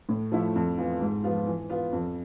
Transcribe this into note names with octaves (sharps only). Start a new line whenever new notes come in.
A2
F3 A3 E4
F2
E3 B3 F4
G#2
F3 B3 F4
E3
B3 F4
F2